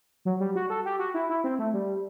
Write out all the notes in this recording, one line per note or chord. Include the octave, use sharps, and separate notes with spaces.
F#3
G3
F#4
A4
G4
F#4
E4
E4
C4
A3
G3